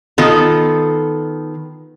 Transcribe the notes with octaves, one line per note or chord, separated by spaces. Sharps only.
D#3 B3 F4 A4